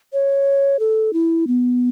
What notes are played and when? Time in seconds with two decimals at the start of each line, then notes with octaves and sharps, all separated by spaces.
0.13 C#5
0.79 A4
1.13 E4
1.47 B3